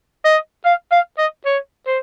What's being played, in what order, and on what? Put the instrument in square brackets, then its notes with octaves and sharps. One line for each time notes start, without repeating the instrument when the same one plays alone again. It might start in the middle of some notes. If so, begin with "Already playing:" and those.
[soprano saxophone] D#5
F5
F5
D#5
C#5
C5